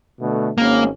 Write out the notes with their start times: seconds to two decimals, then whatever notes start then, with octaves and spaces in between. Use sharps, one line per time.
0.21 B2 D3 A3
0.58 G#1 G#3 A#3 C#4